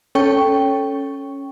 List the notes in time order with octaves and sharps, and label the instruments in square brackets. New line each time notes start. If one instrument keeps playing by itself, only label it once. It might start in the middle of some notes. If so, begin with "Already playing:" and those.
[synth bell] C#4 A4 C#5 G5 C#6